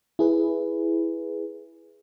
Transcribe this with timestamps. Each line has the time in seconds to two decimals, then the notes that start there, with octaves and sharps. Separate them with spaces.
0.19 E4 G#4 B4